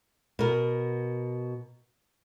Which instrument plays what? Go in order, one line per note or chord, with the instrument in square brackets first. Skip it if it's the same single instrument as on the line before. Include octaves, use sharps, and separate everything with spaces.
[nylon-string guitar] B2 A#4